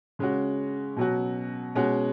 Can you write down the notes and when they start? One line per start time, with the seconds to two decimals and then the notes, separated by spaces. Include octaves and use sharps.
0.19 C#3 G#3 C#4 F#4
0.96 B2 F#3 C#4 F#4
1.75 B2 G#3 C#4 F#4